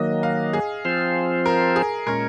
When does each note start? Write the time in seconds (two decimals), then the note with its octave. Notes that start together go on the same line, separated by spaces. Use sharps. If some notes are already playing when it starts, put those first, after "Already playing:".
Already playing: D#3 F#3 A#3 D#5
0.23 F5
0.53 G#4
0.85 F3 C4 F4 C5
1.46 A#4
1.76 G#4
2.07 A#2 G#3 C#4 A#4